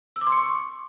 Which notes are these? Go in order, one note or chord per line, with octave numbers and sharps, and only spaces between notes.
E6
D6
C6
C#7
C#6